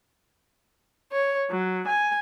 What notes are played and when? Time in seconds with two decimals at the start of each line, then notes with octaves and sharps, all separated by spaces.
1.12 C#5
1.50 F#3
1.87 G#5